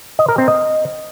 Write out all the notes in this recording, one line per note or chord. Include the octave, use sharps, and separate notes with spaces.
D#5
A#4
C4
D#5